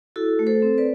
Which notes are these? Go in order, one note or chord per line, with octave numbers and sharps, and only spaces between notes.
E4 F#4 A4
A3
A4 C5
C4
B4 D5